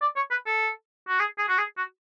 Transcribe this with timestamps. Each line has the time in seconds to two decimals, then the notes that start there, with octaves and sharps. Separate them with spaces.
0.02 D5
0.16 C#5
0.31 B4
0.46 A4
1.08 F#4
1.19 G#4
1.38 G#4
1.48 F#4
1.58 G#4
1.77 F#4